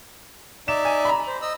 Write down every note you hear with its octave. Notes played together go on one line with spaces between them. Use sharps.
D#4 D5 E5 E7
G#5
A#5 B5
C5
D#5 E6